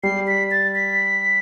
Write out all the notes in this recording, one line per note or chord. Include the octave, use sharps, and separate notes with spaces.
G3 C7
B6
A6
B6